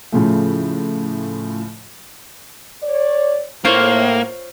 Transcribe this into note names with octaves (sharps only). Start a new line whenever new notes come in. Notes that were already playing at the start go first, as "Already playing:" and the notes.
A2 C#3 F3 A3
C#5 D5
A2 A#3 F4 C5 C#5